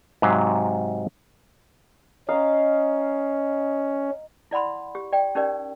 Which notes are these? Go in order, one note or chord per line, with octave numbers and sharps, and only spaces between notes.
G#2 C3 F#3 E5 F5
C#4 D#5 F5 A#5
E4 D5 F#5 B5 C6
G4
D5 G5
C#4 D#4 G4 A#4 D5